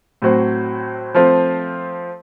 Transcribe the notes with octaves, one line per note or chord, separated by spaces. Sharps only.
A2 F#3 C4 F#4 C5
F3 A3 C4 F4 C5